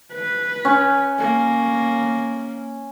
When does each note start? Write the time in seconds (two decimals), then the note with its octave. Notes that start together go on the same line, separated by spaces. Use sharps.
0.12 B4
0.65 C#4
1.19 A#3